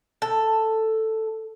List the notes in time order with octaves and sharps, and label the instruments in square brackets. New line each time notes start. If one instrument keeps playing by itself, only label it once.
[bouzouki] A4